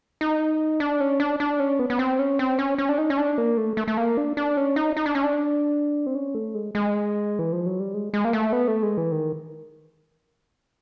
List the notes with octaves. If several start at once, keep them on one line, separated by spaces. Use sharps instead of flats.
D#4
D4
C#4
D4
D4
C#4
B3
B3
C4
C#4
C4
C#4
C#4
D4
D#4
C#4
D4
A#3
A3
A3
A3
A#3
D4
D4
C#4
D#4
D#4
D4
C#4
D4
C4
C#4
A3
G#3
G#3
E3
F3
F#3
G3
G#3
G#3
A#3
A3
B3
A3
G#3
E3
D#3